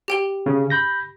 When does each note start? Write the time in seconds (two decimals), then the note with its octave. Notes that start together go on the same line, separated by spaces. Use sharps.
0.08 G4 G5 G7
0.46 C#3
0.70 B5 G6 A#6